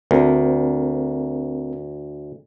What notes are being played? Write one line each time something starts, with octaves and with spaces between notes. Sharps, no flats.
D2 C4 A#4